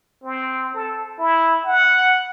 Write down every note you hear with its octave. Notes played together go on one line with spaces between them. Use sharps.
C4
A4
E4
F#5